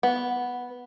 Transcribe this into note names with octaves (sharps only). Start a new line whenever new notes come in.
B3